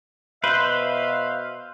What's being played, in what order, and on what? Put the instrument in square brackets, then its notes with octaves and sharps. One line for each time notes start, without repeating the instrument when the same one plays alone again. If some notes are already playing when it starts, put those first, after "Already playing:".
[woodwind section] B2 E5 F5 [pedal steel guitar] B4 C5